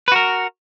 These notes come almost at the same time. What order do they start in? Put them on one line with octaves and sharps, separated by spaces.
B4 F#4 A#4